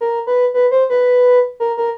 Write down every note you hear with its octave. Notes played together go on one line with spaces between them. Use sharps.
A#4
B4
B4
C5
B4
A#4
A#4